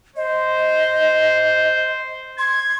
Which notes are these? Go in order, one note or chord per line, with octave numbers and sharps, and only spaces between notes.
C5 D#5
C6 G#6